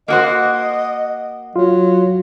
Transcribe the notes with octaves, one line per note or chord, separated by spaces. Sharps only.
A#3 F#4 C5 D#5
F#3 F4